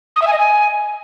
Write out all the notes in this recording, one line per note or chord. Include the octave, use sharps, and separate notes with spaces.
D#6
E5
G#5
D#5
G#5